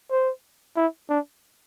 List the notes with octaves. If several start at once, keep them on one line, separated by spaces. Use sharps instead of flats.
C5
E4
D4